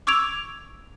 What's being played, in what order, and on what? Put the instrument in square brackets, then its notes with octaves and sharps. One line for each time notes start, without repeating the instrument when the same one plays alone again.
[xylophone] C#6 D6 E6 G#6 D7 F7